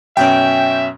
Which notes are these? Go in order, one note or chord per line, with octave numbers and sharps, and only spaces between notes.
F#2 B2 C#4 E5 G5